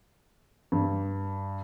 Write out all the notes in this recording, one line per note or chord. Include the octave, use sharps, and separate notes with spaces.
G2